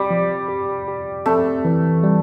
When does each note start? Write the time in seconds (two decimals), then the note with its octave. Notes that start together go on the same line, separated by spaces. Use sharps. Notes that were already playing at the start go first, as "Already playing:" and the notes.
Already playing: G3 C4
0.11 F3
0.49 G4
0.88 G4
1.26 A3 C4
1.65 E3
2.03 G3